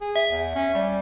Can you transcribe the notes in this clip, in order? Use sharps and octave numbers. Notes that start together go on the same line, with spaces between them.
G#4
E5
E2
C#4
G3